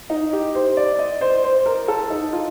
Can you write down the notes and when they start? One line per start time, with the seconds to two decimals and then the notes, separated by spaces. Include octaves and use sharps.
0.10 D#4
0.33 G4
0.55 C5
0.77 D5
0.99 D#5
1.21 C5
1.44 C5
1.66 A#4
1.88 A4
2.10 D#4
2.33 F4